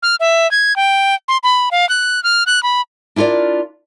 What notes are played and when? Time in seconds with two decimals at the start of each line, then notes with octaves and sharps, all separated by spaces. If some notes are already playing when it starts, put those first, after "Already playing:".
0.03 F6
0.20 E5
0.51 G#6
0.76 G5
1.28 C6
1.43 B5
1.71 F5
1.89 F#6
2.24 F6
2.46 F#6
2.63 B5
3.16 D4 E4 F4 A#4 D5